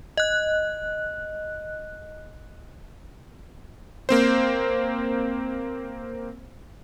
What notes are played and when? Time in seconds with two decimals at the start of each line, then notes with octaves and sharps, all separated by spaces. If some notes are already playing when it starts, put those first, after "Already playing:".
0.17 D#5 F#6
4.09 A#3 C4 C5